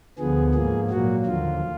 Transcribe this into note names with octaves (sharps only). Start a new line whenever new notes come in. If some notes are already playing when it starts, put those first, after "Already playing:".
D2 D3 F3 B3 G#4
G#2 F3 A#3 G#4
A#2 F#3 A#3 F#4
D#2 D3 F3 F4